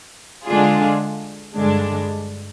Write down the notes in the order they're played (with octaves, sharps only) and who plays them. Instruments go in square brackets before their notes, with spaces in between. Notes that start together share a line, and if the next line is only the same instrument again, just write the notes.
[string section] D3 G#3 D4 F4 G#4
G2 D3 G#3 D4